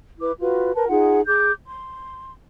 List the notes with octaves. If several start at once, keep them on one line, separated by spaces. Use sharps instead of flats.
E4 B4 D6
F4 F#4 B4
A#4 B4 A5
D#4 F4 G#4 F#5
G#4 D6 G6
C6